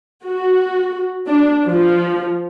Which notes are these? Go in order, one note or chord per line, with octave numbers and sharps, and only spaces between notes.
F#4
D4
F3